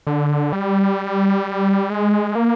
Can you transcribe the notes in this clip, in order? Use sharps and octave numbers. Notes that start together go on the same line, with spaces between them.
D3
G3
G#3
A#3